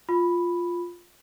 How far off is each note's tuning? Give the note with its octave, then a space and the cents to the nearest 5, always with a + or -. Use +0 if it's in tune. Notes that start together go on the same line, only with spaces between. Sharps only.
F4 +0 B5 +0